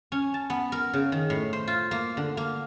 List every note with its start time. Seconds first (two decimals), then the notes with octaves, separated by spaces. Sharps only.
0.12 C#4
0.34 A5
0.50 B3
0.72 A#4
0.93 C#3
1.12 D#3
1.30 A2
1.53 C5
1.67 F4
1.91 A#3
2.17 D3
2.37 A#3